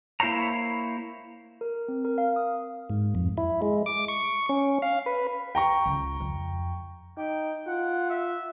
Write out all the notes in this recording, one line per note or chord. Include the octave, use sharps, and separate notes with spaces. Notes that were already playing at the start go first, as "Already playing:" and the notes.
A#3 E4 C5 C#5 A#5
A#4
C4
A#4
F5
D#6
G#2
F2
E4
G#3
D6
C#6
C#4
F5
B4
G5 A#5 C#6
C#2
F2
D#4 G5
F4 F#5
E5